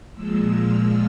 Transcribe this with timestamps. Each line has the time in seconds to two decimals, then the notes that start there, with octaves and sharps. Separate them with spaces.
0.13 A#2 F3 G#3 E6
0.51 F6